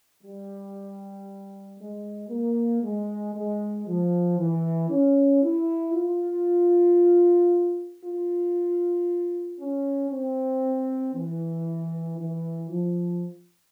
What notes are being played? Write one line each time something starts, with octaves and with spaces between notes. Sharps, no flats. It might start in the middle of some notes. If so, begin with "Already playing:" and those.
G3
G#3
A#3
G#3
G#3
F3
E3
C#4
E4
F4
F4
C#4
C4
E3
E3
F3